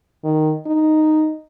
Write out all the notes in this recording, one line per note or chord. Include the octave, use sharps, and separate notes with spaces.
D#3
D#4